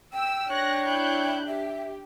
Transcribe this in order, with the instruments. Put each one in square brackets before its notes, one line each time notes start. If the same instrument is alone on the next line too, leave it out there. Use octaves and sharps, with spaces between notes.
[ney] G5 [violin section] E6
[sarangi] D4 [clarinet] C#5 [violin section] F#6 A#6
[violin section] E4 F#6 G6
[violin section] G4 [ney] E5